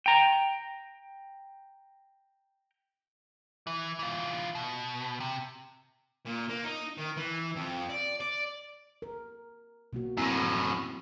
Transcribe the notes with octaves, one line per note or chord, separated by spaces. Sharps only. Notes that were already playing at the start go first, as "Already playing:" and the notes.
G5 A#5
E3
E3 F4
B2
C3
A#2
A#3
D#4
D#3
E3
F2
D5
D5
A#4
B2 A#3 F#4
F#2 A2 C4 E4